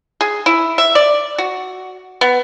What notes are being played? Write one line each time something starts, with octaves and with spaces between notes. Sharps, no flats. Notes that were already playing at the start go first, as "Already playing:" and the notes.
G#4
E4
E5
D5
F#4
B3